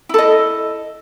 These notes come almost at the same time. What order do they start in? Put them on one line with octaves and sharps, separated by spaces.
E4 A4 D#5